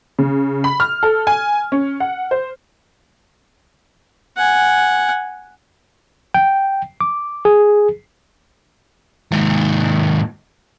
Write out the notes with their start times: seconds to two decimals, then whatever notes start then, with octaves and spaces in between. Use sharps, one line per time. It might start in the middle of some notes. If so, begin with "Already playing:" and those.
0.19 C#3
0.64 B5
0.80 F6
1.03 A4
1.27 G#5
1.72 C#4
2.00 F#5
2.31 C5
4.37 F#5 G#5
6.34 G5
7.01 D6
7.45 G#4
9.32 D#2 G#2